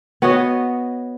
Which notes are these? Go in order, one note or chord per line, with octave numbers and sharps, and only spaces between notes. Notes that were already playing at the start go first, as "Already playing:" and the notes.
B3 F#4 C#5 D#5